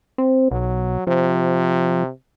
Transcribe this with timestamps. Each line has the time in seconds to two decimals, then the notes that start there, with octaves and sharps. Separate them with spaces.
0.18 C4
0.51 B1 F#3
1.07 C3 F3